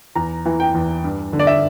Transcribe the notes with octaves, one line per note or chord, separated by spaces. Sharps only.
E2 A#5
E3
G5
E2
G2
D3
D5
E5